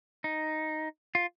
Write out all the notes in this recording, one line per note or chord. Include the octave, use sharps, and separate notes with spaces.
D#4
F4